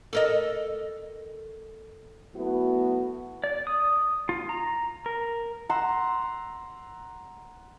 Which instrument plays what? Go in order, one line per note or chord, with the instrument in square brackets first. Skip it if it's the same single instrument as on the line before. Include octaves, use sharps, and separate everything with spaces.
[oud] A4 A#4 D#5
[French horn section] F#3 A3 B3 E4 F#4
[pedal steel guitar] D5
D#6
F4
A#5
A#4
[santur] F#5 A#5 C6 E6